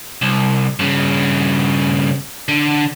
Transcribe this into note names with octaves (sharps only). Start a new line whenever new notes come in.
C2
G2 C#3
D3